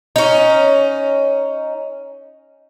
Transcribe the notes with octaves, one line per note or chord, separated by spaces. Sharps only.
C#4 D#4